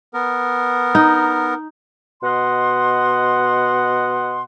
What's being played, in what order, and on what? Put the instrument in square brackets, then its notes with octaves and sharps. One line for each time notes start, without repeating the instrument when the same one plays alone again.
[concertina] B3 A#4
[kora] D#4
[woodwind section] B2 D#5 F#5 C6